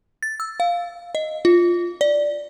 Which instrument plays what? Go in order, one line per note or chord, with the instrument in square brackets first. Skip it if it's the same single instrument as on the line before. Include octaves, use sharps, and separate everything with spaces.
[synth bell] A6
E6
F5
D#5
F4
D5